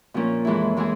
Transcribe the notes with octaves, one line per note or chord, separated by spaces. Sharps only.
A#2 F3 A#3 C#4
F2 E3 G#3 E4
E3 G#3 E4 G#4